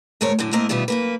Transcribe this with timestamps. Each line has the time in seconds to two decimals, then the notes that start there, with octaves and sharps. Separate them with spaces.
0.21 D2 G#2 A3 A#4 C#5
0.39 F#2 A2 D3
0.52 A2 A3 A#3 C4 A#4 D#5
0.69 B2 D#3 G3 F4 E5
0.88 F#2 A#3 B4